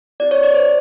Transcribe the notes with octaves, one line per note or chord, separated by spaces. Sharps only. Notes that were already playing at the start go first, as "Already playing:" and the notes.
C4 E4 G4 D5
C#5
D5
C5